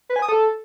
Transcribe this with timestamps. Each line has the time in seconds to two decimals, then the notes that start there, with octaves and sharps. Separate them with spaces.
0.09 B4
0.16 G#5
0.22 D#6
0.29 A4